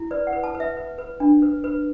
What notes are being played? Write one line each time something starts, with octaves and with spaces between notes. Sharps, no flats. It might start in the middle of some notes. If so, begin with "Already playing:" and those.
Already playing: E4
B4 D5
F#5
B4
A5
B4
E5
B4
B4
D4
B4
B4